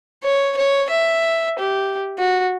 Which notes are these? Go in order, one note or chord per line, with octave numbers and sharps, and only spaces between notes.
C#5
C#5
E5
G4
F#4